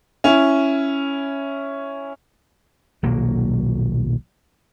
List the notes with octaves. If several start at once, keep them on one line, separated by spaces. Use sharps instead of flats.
C#4 E4
D#1 B1 F#3 A#3